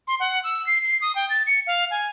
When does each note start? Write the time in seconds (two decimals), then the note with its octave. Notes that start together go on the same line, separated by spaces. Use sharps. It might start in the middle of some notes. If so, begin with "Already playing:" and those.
0.08 C6
0.20 F#5
0.44 E6
0.67 C7
0.85 C7
1.01 D#6
1.15 G5
1.30 A6
1.47 C#7
1.67 F5
1.91 G#5